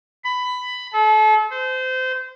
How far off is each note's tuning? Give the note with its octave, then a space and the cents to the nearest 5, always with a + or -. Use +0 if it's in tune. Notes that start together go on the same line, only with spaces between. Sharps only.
B5 +15
A4 -35
C5 -25